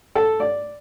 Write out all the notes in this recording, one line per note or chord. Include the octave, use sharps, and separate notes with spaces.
A4
D5